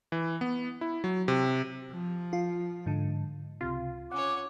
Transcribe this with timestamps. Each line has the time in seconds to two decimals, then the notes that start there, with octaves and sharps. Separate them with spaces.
0.12 E3
0.41 B3
0.81 E4
1.04 F#3
1.28 C3
1.92 F3
2.33 F4
2.86 G#2 D3
3.61 C#2 C3 F4
4.12 C#4 C#5 F#5 D6